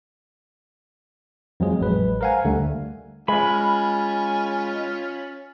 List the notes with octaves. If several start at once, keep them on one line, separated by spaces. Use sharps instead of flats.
F2 F3 F#3 G#3 G#4
A1 F#3 G#3 B4
A#4 C5 F5 F#5 G#5
D2 D3 G3 A3
G#3 C#4 F4 G#5 B5